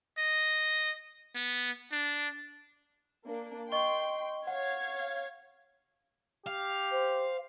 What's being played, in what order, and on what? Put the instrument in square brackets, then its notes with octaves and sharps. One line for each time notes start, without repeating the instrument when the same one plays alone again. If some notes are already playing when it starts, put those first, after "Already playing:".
[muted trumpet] D#5
B3
D4
[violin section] A#3 D4
[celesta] D#5 C#6 G7 [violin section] G5 C6
[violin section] C#5 F5 G#6 [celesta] F#5
[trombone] G4 [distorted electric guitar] F5
[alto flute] C5